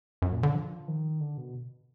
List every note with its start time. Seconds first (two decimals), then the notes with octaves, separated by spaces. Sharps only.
0.22 F#2
0.32 A#2
0.43 D3
0.55 F3
0.88 D#3
1.20 D3
1.38 B2